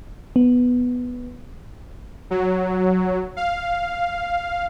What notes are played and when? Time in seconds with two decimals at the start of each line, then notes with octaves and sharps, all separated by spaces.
0.36 B3
2.31 F#3
3.37 F5